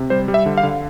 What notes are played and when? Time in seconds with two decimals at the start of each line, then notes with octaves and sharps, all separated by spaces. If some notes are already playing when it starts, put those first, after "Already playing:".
Already playing: C3
0.10 G3 C5
0.28 G3
0.34 E5
0.46 D3
0.58 F5
0.63 D3